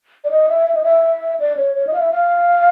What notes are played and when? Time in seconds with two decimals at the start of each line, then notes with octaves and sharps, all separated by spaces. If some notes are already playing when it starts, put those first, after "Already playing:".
0.24 D5
0.31 D#5
0.49 E5
0.67 E5
0.75 D#5
0.83 E5
1.40 D5
1.57 C#5
1.75 C#5
1.87 D#5
1.93 F5
2.00 E5
2.11 F5